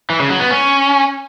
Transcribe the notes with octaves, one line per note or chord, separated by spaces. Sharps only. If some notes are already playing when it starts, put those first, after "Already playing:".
E3
C#3
F#3
B3
C#4